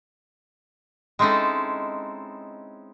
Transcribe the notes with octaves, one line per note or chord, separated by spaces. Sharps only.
G#3 C4 C#4 D#4 E4 A4